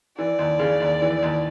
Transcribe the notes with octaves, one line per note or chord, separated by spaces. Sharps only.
E3 D5
D#2
C#3
D#2
E3
D#2